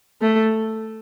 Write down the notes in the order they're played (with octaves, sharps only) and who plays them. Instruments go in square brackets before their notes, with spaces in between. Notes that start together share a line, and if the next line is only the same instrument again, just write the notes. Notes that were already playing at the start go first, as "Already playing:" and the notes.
[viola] A3